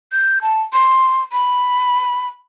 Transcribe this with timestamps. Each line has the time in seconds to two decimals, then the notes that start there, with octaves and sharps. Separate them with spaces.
0.12 G6
0.42 A5
0.73 C6
1.32 B5